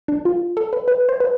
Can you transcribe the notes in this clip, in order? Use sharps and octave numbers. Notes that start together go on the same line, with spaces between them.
D4
F4
A4
B4
B4
C5
B4